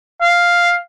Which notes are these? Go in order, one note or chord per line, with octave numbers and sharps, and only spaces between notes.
F5